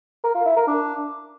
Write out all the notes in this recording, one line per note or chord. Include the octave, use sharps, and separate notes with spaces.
A#4
F4
E4
A#4
D4